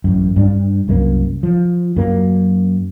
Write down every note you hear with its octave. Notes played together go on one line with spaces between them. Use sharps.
A1 F#2
G2 C#4 D4
C2 F#2 G#3 A#3
F3
F#2 F#3 A#3